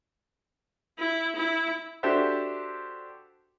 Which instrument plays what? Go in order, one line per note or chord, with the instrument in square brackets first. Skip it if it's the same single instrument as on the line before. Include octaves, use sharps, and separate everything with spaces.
[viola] E4
E4
[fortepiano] D4 F#4 G4 A4 C5 E5